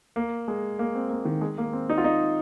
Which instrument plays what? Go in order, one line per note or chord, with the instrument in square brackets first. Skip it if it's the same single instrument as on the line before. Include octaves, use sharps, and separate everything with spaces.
[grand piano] A#3
G#3
A#3
C4
A#3
D#3
G#3
A#3
C4
D#4
F4
D#4